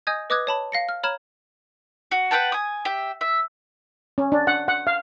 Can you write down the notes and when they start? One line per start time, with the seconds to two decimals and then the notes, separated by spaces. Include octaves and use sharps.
0.07 D#5 G#5 D#6 G6 G#6
0.30 B4 D#5 D6 D#6 F#6 G#6
0.47 C#5 A5 B5
0.72 F5 A#6 C#7
0.89 F6
1.03 C#5 A#5 B5 F6 G#6 E7
2.11 F#4
2.31 B4 F#5 G5 A5
2.52 G#5 D#6
2.85 G4 E5
3.21 E5
4.18 C#4
4.32 D4
4.47 F#5
4.68 F#5
4.87 F5